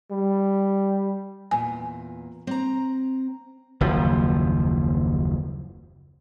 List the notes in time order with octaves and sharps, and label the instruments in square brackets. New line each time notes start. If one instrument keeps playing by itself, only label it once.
[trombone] G3
[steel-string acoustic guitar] E2 A#2 [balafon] G#5
[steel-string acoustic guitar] C4 A#5
[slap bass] F#1 D#2 F3